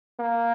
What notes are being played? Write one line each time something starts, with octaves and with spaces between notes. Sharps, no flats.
A#3